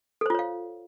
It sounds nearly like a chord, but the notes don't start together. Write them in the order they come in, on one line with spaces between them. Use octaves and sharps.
A4 C5 F4 C#5 F5